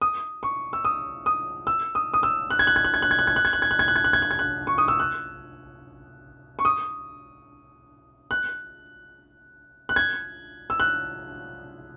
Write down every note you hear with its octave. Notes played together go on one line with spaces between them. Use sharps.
D#6
C#6
E6
D#6
D#6
E6
D#6
D#6
E6
F#6
G#6
F#6
G#6
F#6
G#6
F#6
G#6
F#6
G#6
F#6
G#6
F#6
G#6
F#6
G#6
F#6
G#6
F#6
G#6
F#6
G#6
F#6
C#6
D#6
E6
F#6
C#6
D#6
F#6
F#6
G#6
E6
F#6